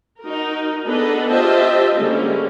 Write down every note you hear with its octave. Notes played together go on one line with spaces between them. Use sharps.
D#4 F#4 A#4
B3 D4 G#4 A4 B4 D#5
F4 G4 C5 D#5 E5 A5
D3 G3 G#3 A#3 C#4